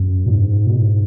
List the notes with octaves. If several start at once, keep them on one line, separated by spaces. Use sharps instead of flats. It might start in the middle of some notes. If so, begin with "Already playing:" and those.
Already playing: F#2
B2
G#2
B2
G#2